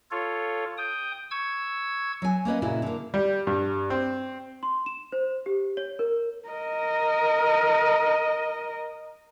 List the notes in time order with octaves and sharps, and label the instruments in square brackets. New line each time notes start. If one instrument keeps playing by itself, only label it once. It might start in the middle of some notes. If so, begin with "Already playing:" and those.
[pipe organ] F4 A4 C#5
G5 D#6
C#6 E6 G#6
[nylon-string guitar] F#3 G#5
A#3 C#4 B4 D#5
A#2 C#3 E4 F#4
D3 A#3
[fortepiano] G3
G2
C4
[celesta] C6
E7
C5
G4
C#5
A#4
[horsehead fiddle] A#4 D#5